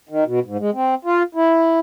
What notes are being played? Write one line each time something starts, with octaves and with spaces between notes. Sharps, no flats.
D#3
B2
G#2
G#3
C4
F4
E4